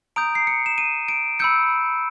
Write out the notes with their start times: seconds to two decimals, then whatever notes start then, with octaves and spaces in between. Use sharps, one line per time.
0.16 A#5 D#6 G6 D7
0.35 C7
0.47 C#7
0.66 E7
0.78 D#7
1.08 D7
1.39 B5 E6 G6 C#7